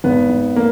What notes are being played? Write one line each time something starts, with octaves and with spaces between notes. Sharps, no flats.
G#1 B3
G#1
A#3